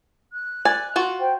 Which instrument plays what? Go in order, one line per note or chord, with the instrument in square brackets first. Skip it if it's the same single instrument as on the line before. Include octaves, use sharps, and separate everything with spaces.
[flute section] F#6
[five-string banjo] D5 G#5
F4 F#4
[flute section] C5 G5